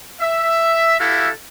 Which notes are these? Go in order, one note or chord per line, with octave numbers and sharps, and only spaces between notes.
E5
E4 F#4 G4 A4 E5 F5